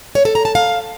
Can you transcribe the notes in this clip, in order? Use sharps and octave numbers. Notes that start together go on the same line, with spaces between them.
C#5
A4
A#5
A5
F5